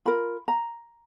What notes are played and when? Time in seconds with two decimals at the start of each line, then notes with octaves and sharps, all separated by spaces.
0.05 F4 A#4 B5
0.48 A#5